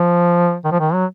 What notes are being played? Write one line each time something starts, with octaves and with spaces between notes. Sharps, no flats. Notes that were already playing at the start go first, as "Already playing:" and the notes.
Already playing: F3
D#3
F3
D#3
F#3